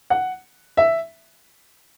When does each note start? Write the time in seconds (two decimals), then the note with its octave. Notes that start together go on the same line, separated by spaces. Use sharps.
0.10 F#5
0.77 E5